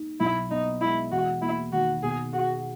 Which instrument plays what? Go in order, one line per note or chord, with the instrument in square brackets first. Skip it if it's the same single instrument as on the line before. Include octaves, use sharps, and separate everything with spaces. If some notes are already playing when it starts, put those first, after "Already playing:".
Already playing: [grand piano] D#4
[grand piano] B1 [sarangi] E4
[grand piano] B3 [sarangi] D#4
[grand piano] G#3 [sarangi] E4
[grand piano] E1 [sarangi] F#4
[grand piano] A#3 [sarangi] E4
[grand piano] D#3 [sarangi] F#4
[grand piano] B2 [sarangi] G#4
[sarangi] F#4 [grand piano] G#4